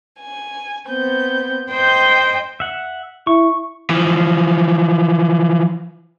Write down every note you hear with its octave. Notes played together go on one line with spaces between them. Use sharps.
G#5
B3 C4 G6
C5 D#5 G5 G6
E5 F#5
E4 C#6
E3 F3